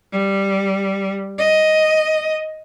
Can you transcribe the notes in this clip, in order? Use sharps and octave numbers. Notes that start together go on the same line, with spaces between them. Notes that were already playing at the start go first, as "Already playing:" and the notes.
G3
D#5